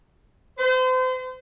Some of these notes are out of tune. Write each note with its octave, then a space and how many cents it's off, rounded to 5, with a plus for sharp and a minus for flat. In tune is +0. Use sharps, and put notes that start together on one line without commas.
C5 -35